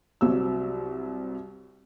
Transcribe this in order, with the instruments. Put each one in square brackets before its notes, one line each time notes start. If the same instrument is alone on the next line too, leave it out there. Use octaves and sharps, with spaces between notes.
[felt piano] C2 F#3 C4 E6